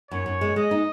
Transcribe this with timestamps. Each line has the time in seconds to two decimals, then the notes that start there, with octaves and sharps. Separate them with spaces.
0.11 F#2 C#5
0.26 F#2
0.41 G#3
0.56 G#3 D#5
0.71 D#4